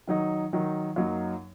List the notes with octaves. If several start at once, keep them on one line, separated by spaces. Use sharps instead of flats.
D#3 F#3 D#4
D#3 F#3 D#4
F#2 F#3 A#3 D#4